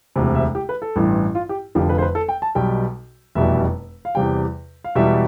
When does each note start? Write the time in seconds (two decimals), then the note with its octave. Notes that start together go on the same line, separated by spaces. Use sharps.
0.16 E1 D2 C3
0.35 E5
0.55 G4
0.69 B4
0.82 A4
0.96 A1 G2 E3
1.35 F4
1.49 G4
1.75 F1 F2 D3 F3 G4
1.89 B4
1.98 C5
2.02 B4
2.15 A4
2.29 G5
2.42 A5
2.55 B1 B2 G3 G5
3.35 F1 E2 B2 G3 E5
4.05 F5
4.15 E2 C3 G3 G5
4.84 F5
4.95 E1 E2 B2 G3 E5